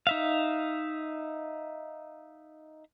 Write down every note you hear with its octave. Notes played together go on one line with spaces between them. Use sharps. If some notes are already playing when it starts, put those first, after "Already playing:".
D#4 E5 F5